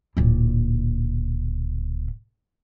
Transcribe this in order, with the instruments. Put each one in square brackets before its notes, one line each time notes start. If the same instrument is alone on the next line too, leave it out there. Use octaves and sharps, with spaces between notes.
[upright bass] D1 A#2